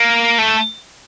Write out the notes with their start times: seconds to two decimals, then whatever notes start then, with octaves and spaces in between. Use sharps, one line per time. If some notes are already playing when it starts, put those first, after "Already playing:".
Already playing: A#3
0.38 A3